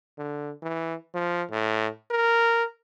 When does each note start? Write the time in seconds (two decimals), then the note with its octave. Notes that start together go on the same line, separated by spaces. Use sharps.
0.18 D3
0.62 E3
1.14 F3
1.51 A2
2.11 A#4